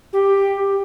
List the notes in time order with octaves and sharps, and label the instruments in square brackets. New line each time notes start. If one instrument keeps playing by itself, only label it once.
[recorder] G4